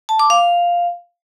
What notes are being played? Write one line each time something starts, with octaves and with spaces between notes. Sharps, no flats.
A5
D6
F5